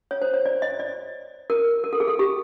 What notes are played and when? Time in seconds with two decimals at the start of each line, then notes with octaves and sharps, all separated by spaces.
0.11 C#5
0.22 C5
0.34 C#5
0.46 D5
0.62 D#5
0.80 D5
1.50 A#4
1.84 A#4
1.93 A4
2.00 G#4
2.08 A4
2.19 G4